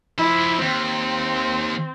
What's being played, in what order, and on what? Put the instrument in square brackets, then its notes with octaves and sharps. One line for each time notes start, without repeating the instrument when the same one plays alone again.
[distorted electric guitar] F3 E5 [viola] E4
[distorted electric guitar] D#2 [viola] C4